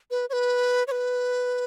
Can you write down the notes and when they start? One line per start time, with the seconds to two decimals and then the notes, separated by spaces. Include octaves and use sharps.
0.11 B4
0.30 C#5
0.33 B4
0.87 C#5
0.91 B4